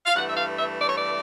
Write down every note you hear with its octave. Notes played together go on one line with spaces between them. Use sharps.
F5
G2 E3 A3 F#5
E5
F5
E5
D5
C#5
D5